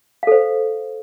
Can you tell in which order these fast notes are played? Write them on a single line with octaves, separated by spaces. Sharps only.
F5 A4 C5